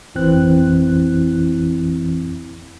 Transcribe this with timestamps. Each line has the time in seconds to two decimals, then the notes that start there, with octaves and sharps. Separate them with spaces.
0.15 G#1 F2 E3 C4 E4 F#6